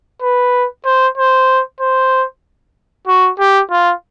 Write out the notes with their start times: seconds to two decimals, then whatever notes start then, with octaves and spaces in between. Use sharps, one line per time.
0.22 B4
0.85 C5
1.17 C5
1.80 C5
3.08 F#4
3.39 G4
3.71 F4